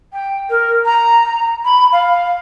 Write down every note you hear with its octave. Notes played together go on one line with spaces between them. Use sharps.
G5
A#4
A#5
B5
F5